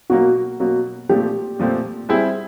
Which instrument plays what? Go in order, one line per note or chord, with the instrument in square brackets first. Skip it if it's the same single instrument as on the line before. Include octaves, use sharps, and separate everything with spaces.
[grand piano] B2 F#3 A#3 [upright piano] F#4
[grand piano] B2 F#3 A#3
[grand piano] A#2 F3 A3 C4 [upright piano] G4
[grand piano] A#2 F3 A3 C4
[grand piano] G3 C4 E4 [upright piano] G#4